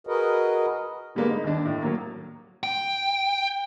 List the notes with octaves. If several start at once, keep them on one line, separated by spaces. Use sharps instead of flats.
F#4 G#4 A#4 B4 D#5
D3 G3 G#3 A#3 B3
D#4
D#2 D4
A2
F#3 A#3
G5